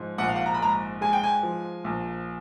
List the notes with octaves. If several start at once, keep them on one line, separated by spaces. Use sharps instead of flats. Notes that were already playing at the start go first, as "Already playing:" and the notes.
Already playing: G#2 F3
A#1 F#5
F5
F#5
A#5
B5
G#2 A#5
G#3 G#5
G5
G#5
F3
A#1